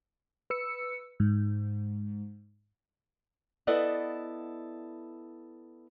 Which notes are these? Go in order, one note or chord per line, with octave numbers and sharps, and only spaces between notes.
B4 E6 C#7
G#2
B3 E4 A4 D5 D#5 F#5